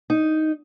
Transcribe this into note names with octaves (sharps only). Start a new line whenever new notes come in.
D#4